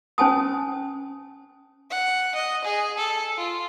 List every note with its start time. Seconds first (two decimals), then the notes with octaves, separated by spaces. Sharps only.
0.18 C#4 C5 G#5 A5 D#6
1.91 F#5
2.35 D#5
2.64 G#4
2.98 A4
3.37 F4